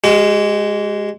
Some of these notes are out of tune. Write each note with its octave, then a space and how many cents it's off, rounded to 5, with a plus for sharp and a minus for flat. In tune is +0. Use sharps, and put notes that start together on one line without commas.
G#3 -5 G4 -45